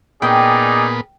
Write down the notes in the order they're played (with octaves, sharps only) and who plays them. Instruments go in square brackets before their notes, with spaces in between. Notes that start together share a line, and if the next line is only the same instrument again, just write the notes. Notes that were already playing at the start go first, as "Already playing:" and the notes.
[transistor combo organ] A#2 B3 [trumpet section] C#4 D#4 D5 [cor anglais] G#4 [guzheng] G5